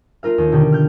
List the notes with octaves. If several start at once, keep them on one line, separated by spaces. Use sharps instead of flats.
A3 F4 A#4 F5
D#2
B2 D3 D#3 D#4 F#4 G4
F6 G6